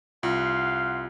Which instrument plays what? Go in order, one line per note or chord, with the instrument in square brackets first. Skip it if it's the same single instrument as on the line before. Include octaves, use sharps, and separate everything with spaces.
[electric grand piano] C2 [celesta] F4 [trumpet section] F5 F#5 C6